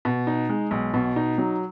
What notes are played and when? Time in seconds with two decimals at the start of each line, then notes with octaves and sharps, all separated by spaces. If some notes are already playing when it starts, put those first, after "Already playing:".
0.05 B2
0.27 D#4
0.49 G#3
0.71 B1
0.94 B2
1.16 D#4
1.38 F#3